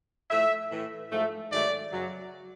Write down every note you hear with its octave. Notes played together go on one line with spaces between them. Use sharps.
A2 F3 A3 E5
A2 E3 A3
G#2 F3 A3
G#2 D#3 F#3 A3 D5
F#2 C#3 F#3